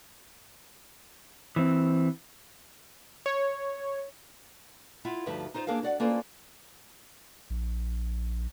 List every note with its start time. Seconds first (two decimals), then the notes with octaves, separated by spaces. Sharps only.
1.56 E3 C4
3.26 C#5
5.05 E4 F4 E5 F#5
5.26 D2 G2 F3 D#4 B4 E5
5.54 D#4 F4 C5
5.67 A#3 D4 G#4 A#4 F5
5.83 F#4 D5 F#5
6.00 A#3 C#4 F4 A4 B4 C5
7.50 A#1